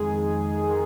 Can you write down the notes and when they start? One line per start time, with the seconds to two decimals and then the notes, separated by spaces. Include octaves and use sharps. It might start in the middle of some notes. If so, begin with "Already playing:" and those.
Already playing: F2 D#3 G#3 G#4
0.68 D#3 G#3